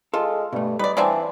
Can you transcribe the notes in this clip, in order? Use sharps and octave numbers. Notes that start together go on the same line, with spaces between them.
G#3 F4 A4
G2 B2 A3
G3 D#4 B4 D5
E3 F#3 C4 D4 D5 F5 G#5